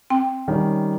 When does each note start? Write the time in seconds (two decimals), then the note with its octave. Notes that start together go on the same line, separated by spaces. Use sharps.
0.10 C4 G5
0.48 D#3 G3 C#4